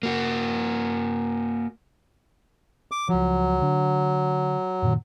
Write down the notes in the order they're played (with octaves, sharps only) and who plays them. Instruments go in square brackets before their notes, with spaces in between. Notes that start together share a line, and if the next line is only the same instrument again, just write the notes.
[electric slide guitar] A#3 F#4
[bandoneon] D6
[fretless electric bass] C#2 F3 [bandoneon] F#3
[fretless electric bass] D3 D4
F#2 A#2 D#3